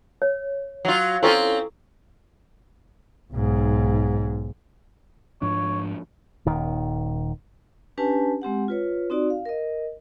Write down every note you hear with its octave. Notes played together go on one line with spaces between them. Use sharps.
C#5
F#3 F4
C4 C#4 E4 F4 A4 C#6
B1 G#2
G#2 F3 D4 C#5
D#1 D#3
C#4 D4 G4 B4 G#5 A5
G#3 C4 G4 F#5
F4 B4 C#5
C4 D#4 F#4 D5
F5
A#4 D#5